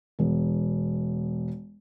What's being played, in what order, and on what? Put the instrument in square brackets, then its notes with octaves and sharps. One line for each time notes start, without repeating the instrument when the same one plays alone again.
[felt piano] E1 B3